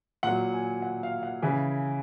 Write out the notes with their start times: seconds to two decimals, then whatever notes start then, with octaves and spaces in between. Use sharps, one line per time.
0.23 A#2 F#3 F#5
0.53 G#5
0.82 F#5
1.03 F5
1.23 F#5
1.42 C#3 E3 G#5